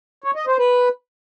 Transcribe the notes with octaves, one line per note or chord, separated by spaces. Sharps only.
C#5
D#5
C5
B4